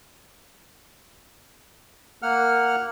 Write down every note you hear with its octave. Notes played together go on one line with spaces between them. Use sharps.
A#3 F#5 F6